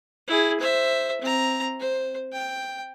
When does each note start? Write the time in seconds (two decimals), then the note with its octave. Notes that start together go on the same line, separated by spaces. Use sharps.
0.28 E4 G#4
0.60 C5 E5
1.21 C4 A#5
1.80 C5
2.32 G5